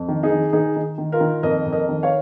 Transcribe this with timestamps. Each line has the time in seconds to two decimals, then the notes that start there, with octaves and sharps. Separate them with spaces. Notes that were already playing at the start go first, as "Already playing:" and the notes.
Already playing: F2
0.08 D#3
0.23 D#4 G#4
0.30 D#3
0.53 D#3 D#4 G#4
0.76 D#3
0.98 D#3
1.12 F4 A#4
1.20 D#3
1.43 F2 A#4 D#5
1.66 F2
1.72 A#4 D#5
1.89 D#3
2.03 C#5 F5